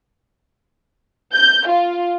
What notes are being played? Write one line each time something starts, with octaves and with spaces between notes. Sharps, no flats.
G6
F4